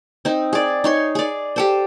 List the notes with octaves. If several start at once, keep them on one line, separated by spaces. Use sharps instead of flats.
C4 D#4
G#4 D5
D#4 C#5 C6
G#4 D5
G4 A4 C5